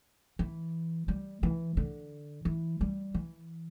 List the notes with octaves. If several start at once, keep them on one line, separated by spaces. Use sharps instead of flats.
E3
G3
E3
D3
E3
G3
E3